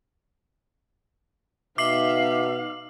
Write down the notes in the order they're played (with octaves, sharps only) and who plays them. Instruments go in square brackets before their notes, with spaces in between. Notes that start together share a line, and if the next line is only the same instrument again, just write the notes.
[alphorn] B2 [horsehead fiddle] D#4 F5 [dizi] E5 [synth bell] D6 C7 F#7